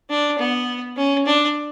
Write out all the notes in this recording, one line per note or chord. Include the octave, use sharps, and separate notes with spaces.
D4
B3
C#4
D4